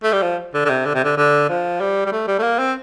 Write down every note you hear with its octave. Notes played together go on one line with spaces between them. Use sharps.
A3
G3
F3
D3
D3
C3
D3
C3
D3
D3
F3
G3
G3
A3
G3
A3
A#3
C4